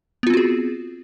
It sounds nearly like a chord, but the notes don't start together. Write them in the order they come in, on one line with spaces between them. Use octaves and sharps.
B3 F4 C4 F#4 G#4